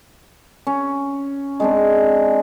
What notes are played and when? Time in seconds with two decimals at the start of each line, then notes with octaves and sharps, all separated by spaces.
0.67 C#4
1.60 G#3 C4 D4